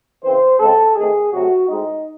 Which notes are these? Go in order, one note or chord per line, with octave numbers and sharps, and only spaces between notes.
C#3 E3 C4 C5
C#3 G#3 C4 A4
D#3 A3 C4 G#4
C3 F#3 A3 F#4
A2 G#3 C4 D#4